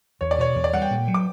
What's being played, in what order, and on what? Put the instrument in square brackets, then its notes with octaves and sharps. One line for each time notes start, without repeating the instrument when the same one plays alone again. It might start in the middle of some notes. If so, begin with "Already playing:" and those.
[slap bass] E2 [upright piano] C#5
[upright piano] D5
[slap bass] B2 [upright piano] C#5
[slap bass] E2
[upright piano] D5
[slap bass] G3 [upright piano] F#5
[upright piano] G5
[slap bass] A#2
F#3
[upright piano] D6